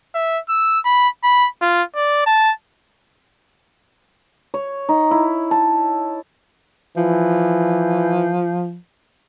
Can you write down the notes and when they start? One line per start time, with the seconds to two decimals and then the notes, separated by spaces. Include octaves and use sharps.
0.15 E5
0.49 E6
0.85 B5
1.24 B5
1.62 F4
1.96 D5
2.26 A5
4.54 C#5
4.89 D#4
5.11 E4
5.51 A5
6.97 E3 F3